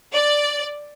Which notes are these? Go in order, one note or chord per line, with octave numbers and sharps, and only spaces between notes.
D5